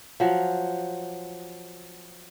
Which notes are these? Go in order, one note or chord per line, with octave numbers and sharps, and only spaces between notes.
F3 F#3